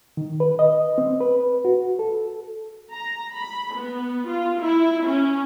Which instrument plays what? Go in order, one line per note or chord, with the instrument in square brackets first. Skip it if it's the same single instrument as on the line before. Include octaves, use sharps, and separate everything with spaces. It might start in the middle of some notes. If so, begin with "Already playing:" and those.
[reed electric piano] D#3
B4
D#5
C4
B4
F#4
A4
[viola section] A#5
B5
B3
F4
E4
C#4